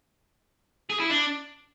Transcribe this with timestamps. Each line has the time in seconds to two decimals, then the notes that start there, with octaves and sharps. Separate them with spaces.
0.90 G#4
1.00 E4
1.10 D4